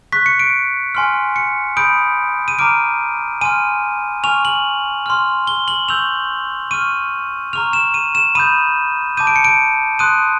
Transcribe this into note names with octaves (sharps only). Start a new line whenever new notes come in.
C#6 F#6 B6
C#7
D7
G#5 C6 F6
C#7
B5 D#6 G6 D7
D#7
A#5 D6 F6 D7
G#5 C6 F6 D#7
G#5 C#6 F6 F7
F#7
C6 F6
G7
F#7
C#6 E6 G6 F7
C#6 F6 D#7
A#5 C#6 F6 F7
E7
D#7
E7
B5 D#6 G6 D#7
A5 D6 G6 D#7
D7
C#7
D7
C6 D#6 F#6 D#7